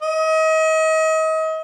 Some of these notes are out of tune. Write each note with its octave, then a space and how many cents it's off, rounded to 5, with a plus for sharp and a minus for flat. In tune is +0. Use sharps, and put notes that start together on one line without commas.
D#5 +35